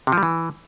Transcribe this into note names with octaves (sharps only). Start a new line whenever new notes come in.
C3
F3
G3
E3